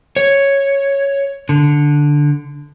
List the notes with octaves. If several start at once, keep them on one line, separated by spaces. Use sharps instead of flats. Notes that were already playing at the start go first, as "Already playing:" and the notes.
C#5
D3